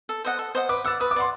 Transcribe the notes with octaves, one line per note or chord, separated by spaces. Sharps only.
A4
C5 D#5 F#5
A4
C5 D#5 F#5
B4 D6
D5 F#5 E6
B4 D#6
D6
D5 F#5 C6